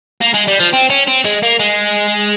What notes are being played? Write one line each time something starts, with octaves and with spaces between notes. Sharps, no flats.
A#3
G#3
G3
F3
C4
C#4
C4
G#3
A#3
G#3